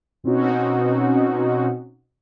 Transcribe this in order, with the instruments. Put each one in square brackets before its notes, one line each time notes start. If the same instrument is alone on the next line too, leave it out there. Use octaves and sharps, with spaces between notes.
[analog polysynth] B2 C4 C#4 D#4 F#4